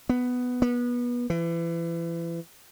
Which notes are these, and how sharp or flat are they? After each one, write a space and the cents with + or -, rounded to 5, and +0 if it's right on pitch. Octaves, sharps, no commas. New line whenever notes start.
B3 +5
B3 -25
E3 +30